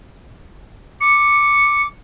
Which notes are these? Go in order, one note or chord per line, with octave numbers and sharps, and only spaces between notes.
D6 C#7